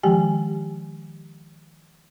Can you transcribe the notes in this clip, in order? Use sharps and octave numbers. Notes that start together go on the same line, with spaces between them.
D#3 F3 G#3 G4 G5 G#5